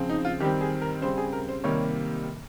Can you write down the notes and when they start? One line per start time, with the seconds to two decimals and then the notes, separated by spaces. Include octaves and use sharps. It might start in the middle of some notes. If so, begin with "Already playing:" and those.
Already playing: C#3 F3 C4
0.09 D#4
0.25 F4
0.40 D#3 G3 C4 G4
0.61 G#4
0.81 A#4
1.01 C#3 G3 C4 C5
1.17 G#4
1.33 A#4
1.49 C5
1.64 C3 D#3 G3 A#3 C#5